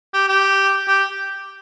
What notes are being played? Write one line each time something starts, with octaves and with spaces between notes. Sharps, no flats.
G4
G4
G4